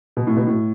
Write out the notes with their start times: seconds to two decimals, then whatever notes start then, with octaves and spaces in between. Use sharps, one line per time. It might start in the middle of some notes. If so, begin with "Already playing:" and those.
0.17 B2
0.27 A2
0.37 B2
0.46 A2